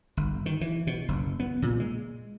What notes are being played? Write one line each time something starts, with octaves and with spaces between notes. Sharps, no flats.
G1
D#3
E3
B2
F#1
B3
A#2
G#3